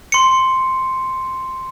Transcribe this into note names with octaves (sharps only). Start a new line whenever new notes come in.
C6 C#7